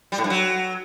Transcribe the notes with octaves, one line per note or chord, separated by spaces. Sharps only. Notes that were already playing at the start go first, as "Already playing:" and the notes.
G3
A2
G2
F#3